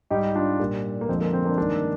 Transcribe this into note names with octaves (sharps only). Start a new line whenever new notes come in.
G#2 G3 D#4 G4
D4 F4
A#2 G3
A#3
F2 D3 F3 G#3 C4
A#3
C4
A#3 D4
G2 D#3 G#3 A#3 D4